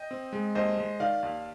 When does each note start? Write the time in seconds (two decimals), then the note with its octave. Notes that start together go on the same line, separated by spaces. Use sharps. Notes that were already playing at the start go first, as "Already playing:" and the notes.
Already playing: D#5 G5
0.11 C4
0.33 G#3
0.55 D#2 C5 D#5
0.78 G#3
1.00 D#3 D5 F5
1.23 D#2